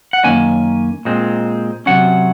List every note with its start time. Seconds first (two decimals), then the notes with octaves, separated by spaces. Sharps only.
0.13 F#5
0.24 F#2 D#3 A#3 C#4 G#5
1.05 A#2 G#3 C4
1.86 C3 F#3 C#4 F#5